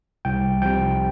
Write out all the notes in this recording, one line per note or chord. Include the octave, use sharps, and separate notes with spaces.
C2 G5
C3 F3 G5